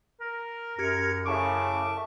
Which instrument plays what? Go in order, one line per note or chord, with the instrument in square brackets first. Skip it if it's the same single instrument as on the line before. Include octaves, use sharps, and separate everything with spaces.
[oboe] A#4
[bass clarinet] F#2 [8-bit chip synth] G4 G#6 C#7
[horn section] A2 C#3 [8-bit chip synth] E5 A5 C#6 [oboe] D6